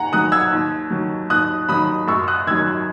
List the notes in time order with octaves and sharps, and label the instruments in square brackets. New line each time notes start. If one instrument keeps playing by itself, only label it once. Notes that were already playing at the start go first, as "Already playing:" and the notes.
Already playing: [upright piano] D#2 F#5 G#5 A#5
D#3 F#3 D#6 F#6
E6 G#6
D#2
D#3 F#3
D#2 D#6 F#6
D#3 F#3 B5 D#6
F#2 C#6 E6
D#6 F#6
D#3 E6 G#6
F#3